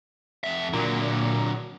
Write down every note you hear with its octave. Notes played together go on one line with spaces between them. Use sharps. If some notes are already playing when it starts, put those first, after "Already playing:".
F2 E5
A#2 D3 F#3